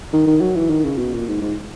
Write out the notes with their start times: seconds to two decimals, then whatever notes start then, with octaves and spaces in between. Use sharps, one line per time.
0.13 D#3
0.27 D#3
0.41 F#3
0.55 E3
0.70 D#3
0.84 C#3
0.98 B2
1.13 A#2
1.28 G#2
1.41 G#2